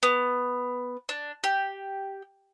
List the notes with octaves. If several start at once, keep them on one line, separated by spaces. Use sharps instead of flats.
B3
D4
G4